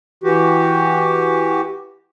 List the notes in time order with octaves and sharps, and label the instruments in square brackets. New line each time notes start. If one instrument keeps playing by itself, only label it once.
[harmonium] E3 F#4 G4